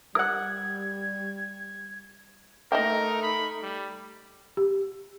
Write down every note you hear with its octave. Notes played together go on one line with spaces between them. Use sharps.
G3 A#4 F#5 E6 G#6
A3 D#4 A#4 D#5 E5 G5
B5
G3
G4